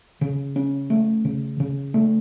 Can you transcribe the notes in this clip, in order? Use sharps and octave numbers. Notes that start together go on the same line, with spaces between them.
C#3
C#4
A3
C#3
C#3
A3